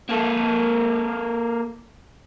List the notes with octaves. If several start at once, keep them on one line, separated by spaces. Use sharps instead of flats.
A#3 A4